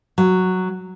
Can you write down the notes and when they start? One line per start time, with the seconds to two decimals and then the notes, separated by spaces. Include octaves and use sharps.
0.18 F#3